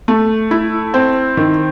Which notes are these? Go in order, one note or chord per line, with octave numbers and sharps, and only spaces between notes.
A3
E4
C4
D#3